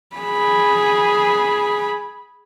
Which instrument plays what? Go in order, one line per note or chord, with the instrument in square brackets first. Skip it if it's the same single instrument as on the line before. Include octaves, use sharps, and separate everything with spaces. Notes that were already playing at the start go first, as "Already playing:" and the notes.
[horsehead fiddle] G#4 B5